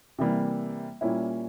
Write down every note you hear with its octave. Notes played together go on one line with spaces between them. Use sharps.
C3 E3 G3 A#3
A#2 G3 A#3 C#4 E4